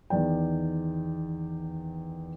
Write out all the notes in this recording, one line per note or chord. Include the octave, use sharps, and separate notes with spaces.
E2 D#3 D5 G5